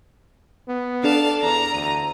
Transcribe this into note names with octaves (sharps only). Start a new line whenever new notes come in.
B3
D4 A4 D5 F5 A5
E2 A#5
D2 D#7